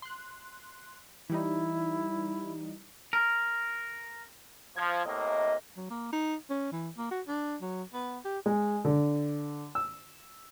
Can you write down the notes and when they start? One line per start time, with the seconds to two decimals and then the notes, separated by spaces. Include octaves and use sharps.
0.02 C6 F#6
1.30 E3 G3 D#4 E4
3.13 A#4
4.76 F3 G#6
5.05 A2 C3 A#3 D#5
5.77 F#3
5.90 A#3
6.13 D#4
6.50 C#4
6.72 E3
6.97 A#3
7.11 F#4
7.28 D4
7.61 F#3
7.93 B3
8.25 G4
8.46 G#3
8.85 D3
9.75 E6